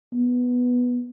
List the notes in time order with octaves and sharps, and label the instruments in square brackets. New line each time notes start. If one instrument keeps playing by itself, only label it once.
[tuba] B3